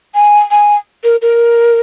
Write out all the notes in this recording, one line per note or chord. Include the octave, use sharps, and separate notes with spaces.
G#5
G#5
A#4
A#4